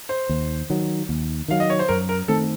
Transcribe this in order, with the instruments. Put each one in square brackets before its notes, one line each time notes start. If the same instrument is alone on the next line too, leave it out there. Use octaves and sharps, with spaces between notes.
[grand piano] C5
[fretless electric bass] D#2
D#3 F#3
D#2
[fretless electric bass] D#3 F#3 [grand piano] F5
[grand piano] D#5
C#5
C5
[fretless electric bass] F#2 [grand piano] A#4
[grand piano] A#4
[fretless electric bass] D#3 A3 C4 [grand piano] A4